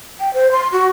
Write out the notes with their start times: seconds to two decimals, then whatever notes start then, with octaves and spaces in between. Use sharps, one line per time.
0.20 G5
0.34 C5
0.52 C6
0.72 F#4